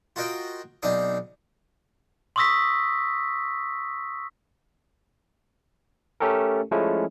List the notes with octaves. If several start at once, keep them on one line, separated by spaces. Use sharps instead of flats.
F4 F#4 A#4 D#5 G5
B1 C4 D4 D#4 F5 D#6
C6 C#6 D#6 E6 A#6 B6
A3 C#4 G4 A4 A#4
F3 G#3 A3 C#4 E4